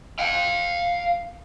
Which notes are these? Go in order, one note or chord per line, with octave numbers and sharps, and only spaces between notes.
F5 G5